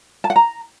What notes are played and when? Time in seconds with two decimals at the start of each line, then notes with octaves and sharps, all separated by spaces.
0.24 A5
0.30 F#5
0.36 A#5